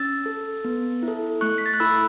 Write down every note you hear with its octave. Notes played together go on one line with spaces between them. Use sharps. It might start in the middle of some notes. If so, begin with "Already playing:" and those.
Already playing: C#4 E6 A6
A4
B3
E4
A4
A3 C#6 F#6
B6
A6
F#6
E4 A4 B5 E6